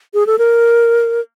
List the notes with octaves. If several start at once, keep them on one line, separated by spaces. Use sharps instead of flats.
G#4
A4
A#4